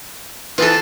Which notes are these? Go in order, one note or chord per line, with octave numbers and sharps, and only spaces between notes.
E3 B3 F4 A4 B4